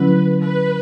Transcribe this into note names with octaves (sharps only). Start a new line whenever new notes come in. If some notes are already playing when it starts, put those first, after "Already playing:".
Already playing: D3 F#3 C#4 E4 B4
B4